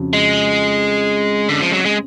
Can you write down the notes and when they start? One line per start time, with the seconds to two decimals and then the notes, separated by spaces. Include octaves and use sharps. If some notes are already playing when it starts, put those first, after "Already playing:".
Already playing: F2 C#3 F#4
0.13 G#3
1.49 D3
1.62 F3
1.73 F#3
1.85 G#3